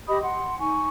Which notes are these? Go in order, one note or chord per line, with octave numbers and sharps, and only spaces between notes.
G4 D#5 B5 D#6
F#5 C6
D#4 G#5 C#6